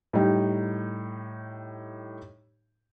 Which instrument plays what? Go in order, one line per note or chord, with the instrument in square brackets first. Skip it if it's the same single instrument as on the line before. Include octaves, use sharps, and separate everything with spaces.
[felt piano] A2 G3 D#4 G4 G5